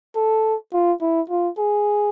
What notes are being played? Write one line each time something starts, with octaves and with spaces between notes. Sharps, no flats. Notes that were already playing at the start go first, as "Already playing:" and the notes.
A4
F4
E4
F4
G#4